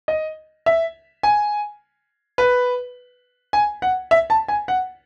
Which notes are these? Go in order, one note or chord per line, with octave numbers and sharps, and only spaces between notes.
D#5
E5
G#5
B4
G#5
F#5
E5
A5
G#5
F#5